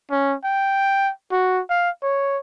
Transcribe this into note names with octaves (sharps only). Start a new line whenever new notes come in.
C#4
G5
F#4
F5
C#5